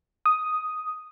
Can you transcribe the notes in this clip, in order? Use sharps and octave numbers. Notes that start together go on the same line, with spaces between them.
D#6